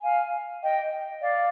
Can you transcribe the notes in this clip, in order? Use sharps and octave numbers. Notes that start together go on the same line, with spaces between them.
F5 G#5
D#5 G5
D5 F5